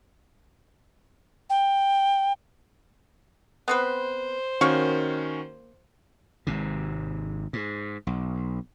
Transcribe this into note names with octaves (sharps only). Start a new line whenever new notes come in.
G5
B3 C4 B4 C5
D#3 A#3 C#4 F#4 C#6
G#1 G#2 C3
G#2
B1